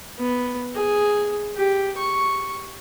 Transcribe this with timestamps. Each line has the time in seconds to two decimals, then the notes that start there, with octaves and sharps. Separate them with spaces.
0.19 B3
0.75 G#4
1.56 G4
1.97 C#6